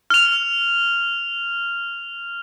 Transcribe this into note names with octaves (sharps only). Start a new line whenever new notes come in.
F6 F7